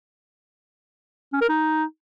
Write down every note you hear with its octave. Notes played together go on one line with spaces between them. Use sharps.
C#4
A#4
D#4